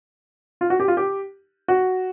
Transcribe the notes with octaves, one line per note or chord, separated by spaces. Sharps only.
F4
F#4
G4
F4
G4
F#4